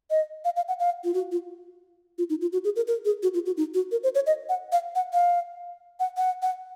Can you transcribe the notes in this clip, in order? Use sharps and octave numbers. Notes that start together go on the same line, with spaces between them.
D#5
F5
F5
F#5
F5
F4
F#4
F4
F4
D#4
F4
F#4
G#4
A#4
A#4
G#4
F#4
F4
F#4
D#4
F#4
A#4
C5
C#5
D#5
F#5
F5
F#5
F5
F#5
F#5
F#5